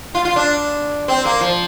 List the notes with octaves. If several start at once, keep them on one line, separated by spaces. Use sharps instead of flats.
F4
F4
D4
C4
A#3
F3